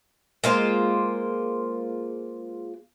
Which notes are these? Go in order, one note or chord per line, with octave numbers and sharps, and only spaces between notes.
G#3 A#3 F4 C5